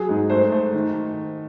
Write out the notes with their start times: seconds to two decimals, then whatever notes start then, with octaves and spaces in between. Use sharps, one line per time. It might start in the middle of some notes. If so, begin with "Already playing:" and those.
Already playing: F#3 G#4
0.09 G#2
0.30 A3 C5
0.52 A3
0.73 D#3